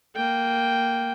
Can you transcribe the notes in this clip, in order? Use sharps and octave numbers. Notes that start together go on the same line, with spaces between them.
A#3 G5